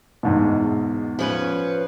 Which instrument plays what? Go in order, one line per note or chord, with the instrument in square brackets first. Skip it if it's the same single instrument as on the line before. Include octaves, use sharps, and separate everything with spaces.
[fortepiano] E2 G#2 B2
[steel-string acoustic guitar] F3 C#4 B4